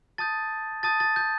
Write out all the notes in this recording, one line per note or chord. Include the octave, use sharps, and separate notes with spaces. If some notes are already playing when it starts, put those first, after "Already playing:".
A5 D#6 G6 A6
A5 D#6 G6 A6
A6
G6